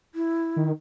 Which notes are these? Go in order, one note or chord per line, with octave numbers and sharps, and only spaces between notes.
E4
D#3